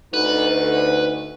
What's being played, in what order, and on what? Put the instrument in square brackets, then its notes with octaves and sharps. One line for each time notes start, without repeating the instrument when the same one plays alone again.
[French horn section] D2 D#4 [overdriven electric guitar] B4